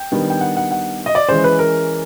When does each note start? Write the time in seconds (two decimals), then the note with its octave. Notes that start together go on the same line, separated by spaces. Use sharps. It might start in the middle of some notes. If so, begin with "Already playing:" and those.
Already playing: G5
0.12 D#3 G3 B3 D4
0.30 G5
0.41 F#5
0.57 F#5
0.71 F#5
1.06 D#5
1.15 D5
1.28 E3 G#3 C#4 C5
1.44 B4
1.59 A#4